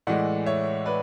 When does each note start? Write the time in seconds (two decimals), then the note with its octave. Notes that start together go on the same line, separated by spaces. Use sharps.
0.07 A2 E3 G#3 D5 F#5
0.46 C#5 E5
0.86 B4 D5